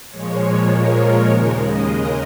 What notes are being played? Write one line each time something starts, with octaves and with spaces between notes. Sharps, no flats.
A#2 F3 G#3 C#5
A#4
D#2 C#3 G#3 C#5
D#5
A#4